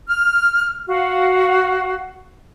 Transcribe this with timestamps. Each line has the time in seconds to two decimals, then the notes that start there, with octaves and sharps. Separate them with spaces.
0.07 F6
0.87 F#4 F5